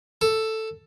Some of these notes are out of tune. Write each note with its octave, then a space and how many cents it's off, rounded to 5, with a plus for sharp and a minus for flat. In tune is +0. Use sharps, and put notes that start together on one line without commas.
A4 +5